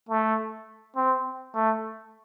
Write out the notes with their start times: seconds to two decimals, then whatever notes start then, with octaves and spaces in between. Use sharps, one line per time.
0.09 A3
0.96 C4
1.55 A3